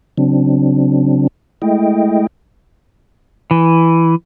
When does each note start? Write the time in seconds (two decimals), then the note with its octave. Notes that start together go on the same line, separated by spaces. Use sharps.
0.18 C#3 F#3 C4 D4
1.62 G#3 A3 E4 D#5 G5
3.51 E3